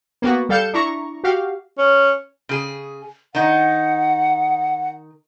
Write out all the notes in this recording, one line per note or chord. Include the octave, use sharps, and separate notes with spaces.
A#3 B3 F#4
G3 A4 F5 G6 C#7 E7
D4 E4 A#5 C#6
F#4 G4 F5
C#4
C#3 G#4
D#3 D#4 F#5